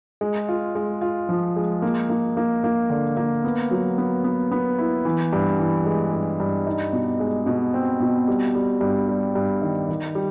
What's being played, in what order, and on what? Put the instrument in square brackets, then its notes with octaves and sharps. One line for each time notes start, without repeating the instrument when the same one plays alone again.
[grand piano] G#3
F4
G#3
F4
F3
G#3
A#3
A#3
A#3
A#3
D3
A#3
B3
F#3
B3
B3
B3
E4
E3
G2
E3
G#3
G2
G2
D#4
B2
G#3
B2
C4
B2
G3
G3
G2
G3
G2
D#3
D#3
G3